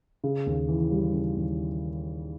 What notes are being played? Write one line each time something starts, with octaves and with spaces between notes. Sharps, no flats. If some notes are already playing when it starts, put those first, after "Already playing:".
C#3
D#2
E3
G3
C#3
D#2